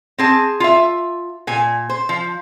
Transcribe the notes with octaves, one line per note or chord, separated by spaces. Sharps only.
C4 G#4 A5
F4 E5
A#2 G#5
C5
F3